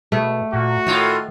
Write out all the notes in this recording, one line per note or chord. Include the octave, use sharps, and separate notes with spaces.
B2 A3
A#2 F#4
A2 D#3 F4